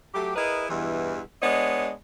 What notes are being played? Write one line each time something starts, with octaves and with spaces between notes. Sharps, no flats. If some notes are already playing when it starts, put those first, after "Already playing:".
F#3 A3 G4
E4 G#4 A#4 B4 D#5
E2 G2 B2 E3
G#3 B3 D4 C#5 D#5